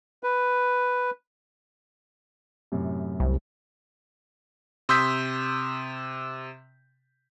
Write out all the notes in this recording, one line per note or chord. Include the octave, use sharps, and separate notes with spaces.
B4
F#2 A2 C3
C2
C3 C6 D#6 E6 G6 B6